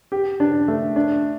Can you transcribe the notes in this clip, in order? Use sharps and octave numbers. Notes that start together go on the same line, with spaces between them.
G4
D4
A3
D4